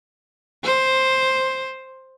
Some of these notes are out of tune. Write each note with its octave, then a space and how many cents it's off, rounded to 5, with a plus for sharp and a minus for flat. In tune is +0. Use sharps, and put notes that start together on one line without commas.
C5 +5